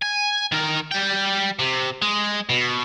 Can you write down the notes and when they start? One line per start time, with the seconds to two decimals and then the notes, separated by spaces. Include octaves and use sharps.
0.02 G#5
0.52 D#3 A#4
0.91 G3 G5
1.59 C3
2.02 G#3
2.49 B2